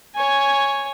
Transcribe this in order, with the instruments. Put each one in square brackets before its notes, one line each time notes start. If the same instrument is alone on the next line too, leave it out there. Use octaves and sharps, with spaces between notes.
[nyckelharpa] C#5 G#5